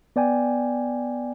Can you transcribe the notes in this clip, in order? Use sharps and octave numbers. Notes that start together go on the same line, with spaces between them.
B3 D5 G5 G#5